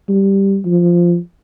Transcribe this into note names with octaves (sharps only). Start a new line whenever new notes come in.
G3
F3